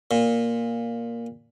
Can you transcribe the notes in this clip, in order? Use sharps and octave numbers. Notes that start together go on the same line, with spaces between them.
A#2